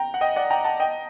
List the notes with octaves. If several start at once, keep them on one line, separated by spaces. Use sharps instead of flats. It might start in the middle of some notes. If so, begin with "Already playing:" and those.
Already playing: G5 A#5
F#5
D#5 G5
D5 F#5
G5 A#5
F#5 A5
D#5 G5